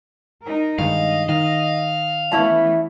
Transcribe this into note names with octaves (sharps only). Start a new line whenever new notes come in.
D#4 A#4
G2 D#3 G#3 D#5 F5
D#3 F5
E3 A3 B3 C#4 E4 A5